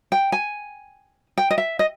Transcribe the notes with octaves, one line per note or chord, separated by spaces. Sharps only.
G5
G#5
G5
D#5
E5
D#5